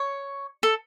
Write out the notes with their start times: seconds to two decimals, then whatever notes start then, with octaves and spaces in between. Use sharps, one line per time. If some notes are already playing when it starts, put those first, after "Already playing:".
Already playing: C#5
0.63 A4